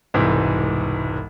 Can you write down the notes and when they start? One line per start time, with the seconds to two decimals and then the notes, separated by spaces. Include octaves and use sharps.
0.14 E1 C2 G#2 E3